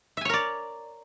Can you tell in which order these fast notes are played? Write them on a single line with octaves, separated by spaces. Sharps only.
E5 G#5 C#5 A#4 D5